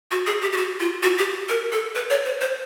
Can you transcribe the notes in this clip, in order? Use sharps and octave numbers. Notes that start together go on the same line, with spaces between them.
F#4
G#4
G4
G4
F#4
F4
F#4
G4
A#4
A4
B4
C#5
C5
C5